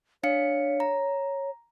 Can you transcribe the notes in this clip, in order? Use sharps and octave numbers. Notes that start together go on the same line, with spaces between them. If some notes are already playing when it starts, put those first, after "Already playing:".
D4 C#5 F5 C#7
A#5